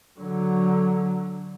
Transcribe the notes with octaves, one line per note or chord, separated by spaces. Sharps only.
D3 F#3